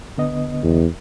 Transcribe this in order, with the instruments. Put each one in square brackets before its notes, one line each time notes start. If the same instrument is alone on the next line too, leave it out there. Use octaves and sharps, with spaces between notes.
[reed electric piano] D3 B3 D#5
[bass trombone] E2